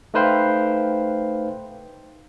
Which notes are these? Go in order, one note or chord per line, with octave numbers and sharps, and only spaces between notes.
A3 D#4 B4 C5 F5 G5